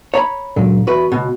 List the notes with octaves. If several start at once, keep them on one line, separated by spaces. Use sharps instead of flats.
C#5 A#5 B5
C#2 F#2 A#2 D3
E2 F#4 B4
C#2 B2